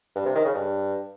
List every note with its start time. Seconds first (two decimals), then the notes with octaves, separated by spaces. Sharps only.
0.16 G2
0.25 C3
0.35 D#3
0.45 C#3
0.55 G2